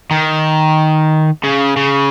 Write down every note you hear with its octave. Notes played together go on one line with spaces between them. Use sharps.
D#3
C#3
C#3